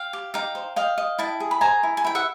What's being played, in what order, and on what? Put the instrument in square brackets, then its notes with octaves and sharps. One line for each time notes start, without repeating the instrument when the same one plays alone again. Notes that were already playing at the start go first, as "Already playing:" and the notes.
Already playing: [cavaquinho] F5 G5
G4
D#4 F5 G5
C5
D#5 F5 G5
D#5
E4 G5 A5
G#4
B5
C5 G#5 A#5
E4
G#5
E4 G5
E5 F#5